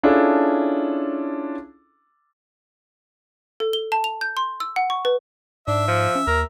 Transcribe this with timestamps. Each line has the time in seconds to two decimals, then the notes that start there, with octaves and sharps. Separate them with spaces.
0.03 C#4 D4 E4 F4 G#4 A4
3.60 A4
3.73 G7
3.92 A5
4.04 F7
4.21 G6
4.37 C6
4.60 E6
4.76 F#5
4.90 C#6
5.05 B4
5.68 G#2 D4 E5
5.88 F3
6.15 C#4
6.27 D#2 A#4